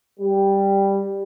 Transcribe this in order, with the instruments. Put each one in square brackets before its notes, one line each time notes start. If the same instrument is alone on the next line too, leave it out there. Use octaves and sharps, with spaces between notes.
[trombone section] G3